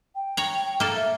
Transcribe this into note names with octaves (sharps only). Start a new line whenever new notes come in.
G5
C#5 A#5
A#3 A4
E5